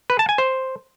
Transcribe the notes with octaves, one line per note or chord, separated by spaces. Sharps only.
B4
A5
G#5
C5